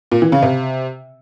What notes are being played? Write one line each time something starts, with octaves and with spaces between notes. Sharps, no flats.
A#2
E3
C#3
C3